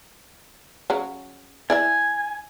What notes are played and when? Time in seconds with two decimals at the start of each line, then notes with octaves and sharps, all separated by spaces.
0.90 C#3 F#3
1.70 E4 D5 E5 G#5